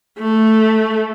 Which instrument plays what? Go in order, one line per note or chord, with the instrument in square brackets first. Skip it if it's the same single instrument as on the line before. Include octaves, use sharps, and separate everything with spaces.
[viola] A3